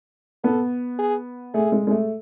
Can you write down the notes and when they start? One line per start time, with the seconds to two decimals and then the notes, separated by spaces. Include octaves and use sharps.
0.44 B3 A4
0.99 G#4
1.54 A3 G#4
1.72 G#3
1.87 G#3
1.91 A3